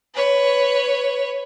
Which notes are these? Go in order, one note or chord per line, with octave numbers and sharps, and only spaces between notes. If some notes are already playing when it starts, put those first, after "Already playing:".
B4 C#5